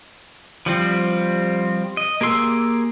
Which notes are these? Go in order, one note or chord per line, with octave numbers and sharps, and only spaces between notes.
F3 G3 C4
D#5
A#3 G4 G#4 C6 E6